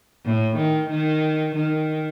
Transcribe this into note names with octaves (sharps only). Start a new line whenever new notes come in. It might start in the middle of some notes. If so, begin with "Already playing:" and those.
A2
D#3
D#3
D#3